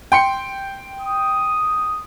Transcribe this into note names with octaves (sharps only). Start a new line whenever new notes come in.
G5 C6 C#7
D#6